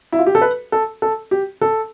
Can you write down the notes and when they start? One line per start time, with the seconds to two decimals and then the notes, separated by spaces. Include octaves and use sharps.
0.12 E4
0.19 F4
0.26 G4
0.35 A4
0.42 B4
0.72 A4
1.02 A4
1.31 G4
1.61 A4